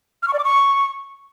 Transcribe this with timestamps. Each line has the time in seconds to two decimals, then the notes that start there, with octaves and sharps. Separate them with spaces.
0.23 F6
0.28 C#6
0.33 D5
0.39 D6
0.44 C#6